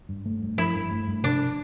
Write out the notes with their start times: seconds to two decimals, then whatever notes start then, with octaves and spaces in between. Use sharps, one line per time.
0.09 G2
0.25 A3
0.42 G2
0.58 F3 E4
0.75 G2
0.91 A3
1.07 G2
1.23 C3 D4